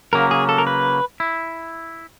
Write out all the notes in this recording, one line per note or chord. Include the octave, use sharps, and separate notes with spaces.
C#3 F#3 A#3 A#4
G#4
A4
A#4
B4
E4